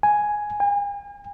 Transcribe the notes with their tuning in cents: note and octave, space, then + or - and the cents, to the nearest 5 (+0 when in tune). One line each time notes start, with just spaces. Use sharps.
G#5 +5
G#5 -40